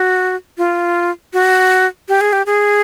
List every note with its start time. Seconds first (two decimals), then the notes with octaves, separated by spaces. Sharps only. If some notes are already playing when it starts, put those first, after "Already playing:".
Already playing: F#4
0.58 F4
1.33 F#4
2.09 G4
2.21 G#4
2.33 G4
2.46 G#4